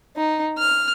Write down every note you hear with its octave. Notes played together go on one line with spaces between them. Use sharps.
D#4
F6